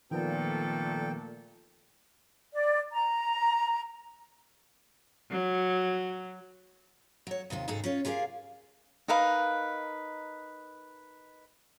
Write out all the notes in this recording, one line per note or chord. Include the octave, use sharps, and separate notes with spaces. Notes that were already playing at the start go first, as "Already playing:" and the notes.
A#2 D#3 F3 A3 B3 A4 G5
D5
A#5
F#3
F#3 C#5
D#2 C3 D#3 F4
D#2 G#2 D#4 G#4 A4
C#4 F4 C#5
F4 G4 G#4 A#4 E5 F5
D#4 A#4 B4 F5